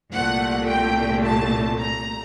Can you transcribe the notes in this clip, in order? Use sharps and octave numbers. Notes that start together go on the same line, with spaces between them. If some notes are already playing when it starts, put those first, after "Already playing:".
C2 A#2 A3 F#5
G5
A5
A#5